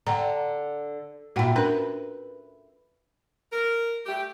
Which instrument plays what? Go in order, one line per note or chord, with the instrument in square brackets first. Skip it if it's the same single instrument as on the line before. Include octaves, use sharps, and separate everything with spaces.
[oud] D3 [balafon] F#5 G5 A#5
[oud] A#2 E4 [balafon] F#4 F#5 G5
[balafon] C#4 D4 A#4 [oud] B4
[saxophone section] A#4
A3 G4